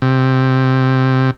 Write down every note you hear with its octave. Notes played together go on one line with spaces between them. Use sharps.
C3